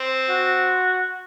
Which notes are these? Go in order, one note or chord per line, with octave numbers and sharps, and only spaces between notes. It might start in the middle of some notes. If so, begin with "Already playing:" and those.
Already playing: C4
F#4